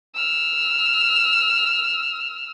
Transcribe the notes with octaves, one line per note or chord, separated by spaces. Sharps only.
E6 F6